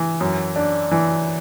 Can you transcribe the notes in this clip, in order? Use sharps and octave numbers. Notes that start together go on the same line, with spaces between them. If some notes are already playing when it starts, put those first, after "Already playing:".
Already playing: E3
F#2
D4
E3